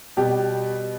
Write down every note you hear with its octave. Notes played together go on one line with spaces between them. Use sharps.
B2 G3 G4